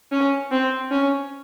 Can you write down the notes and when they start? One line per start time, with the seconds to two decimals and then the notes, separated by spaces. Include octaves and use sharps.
0.12 C#4
0.52 C4
0.91 C#4